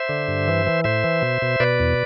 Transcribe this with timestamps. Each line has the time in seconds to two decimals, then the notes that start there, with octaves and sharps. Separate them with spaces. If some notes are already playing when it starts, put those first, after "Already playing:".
Already playing: C5 E5
0.09 D3
0.28 G2
0.48 E3
0.67 E3
0.84 A2 C5 E5
1.04 E3
1.22 B2
1.42 B2
1.60 B2 B4 D5
1.80 E2